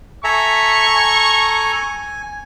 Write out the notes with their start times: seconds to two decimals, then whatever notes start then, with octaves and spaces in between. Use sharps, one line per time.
0.24 A4 E5 G#5 A#5 C#6 E6
0.95 G#5